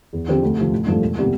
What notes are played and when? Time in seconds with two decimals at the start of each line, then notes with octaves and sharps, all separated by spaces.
0.13 E2
0.28 D3 F3 C4 G4
0.43 D2
0.57 C3 F3
0.72 A1
0.86 G2 F3 A3
1.01 E1
1.18 C3 G3 B3